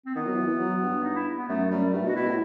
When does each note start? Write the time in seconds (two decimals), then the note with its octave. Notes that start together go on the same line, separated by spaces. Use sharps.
0.06 C4
0.15 D#3 B3
0.26 F#3
0.37 E3
0.48 E3
0.59 F#3
0.82 G2
1.04 D#4
1.15 E4
1.38 B3
1.49 F#2 A3
1.70 F#2 G3
1.93 G2 A3
2.04 B2
2.09 F#4
2.15 B2 E4
2.26 A2